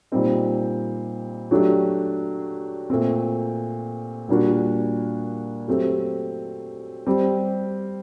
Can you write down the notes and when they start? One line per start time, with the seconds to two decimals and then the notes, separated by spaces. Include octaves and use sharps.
0.12 A#2 G3 C4 D#4
1.51 F#3 A3 D4 G4
2.90 A#2 A3 C4
4.28 A#2 G3 A#3 D4 F#4
5.68 F#3 A3 C4 G4
7.06 G3 C4 G4